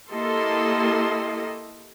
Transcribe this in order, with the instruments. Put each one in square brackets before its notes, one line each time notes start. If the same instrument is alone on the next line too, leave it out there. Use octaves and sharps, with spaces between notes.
[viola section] A#3 E4 G4 A4 D#5 C6